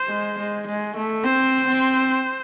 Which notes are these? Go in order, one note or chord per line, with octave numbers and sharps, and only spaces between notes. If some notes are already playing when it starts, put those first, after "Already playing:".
Already playing: C5
G#3
G#3
G#3
A3
C4 C5
C4